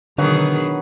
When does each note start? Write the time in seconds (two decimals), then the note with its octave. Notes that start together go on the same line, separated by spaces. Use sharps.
0.18 B2 D3 D#3 F#3 D4 G#4 B4 F#5